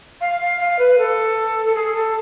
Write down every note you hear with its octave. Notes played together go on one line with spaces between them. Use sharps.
F5
F5
F5
B4
A4
A4
G#4
A4